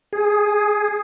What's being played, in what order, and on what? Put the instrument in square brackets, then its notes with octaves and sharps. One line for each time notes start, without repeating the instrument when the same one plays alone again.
[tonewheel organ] G#4